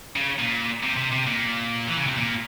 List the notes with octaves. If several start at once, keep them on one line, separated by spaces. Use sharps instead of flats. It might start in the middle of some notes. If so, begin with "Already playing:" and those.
C#3
A#2
C3
C3
C3
A#2
E3
C#3
C3
A#2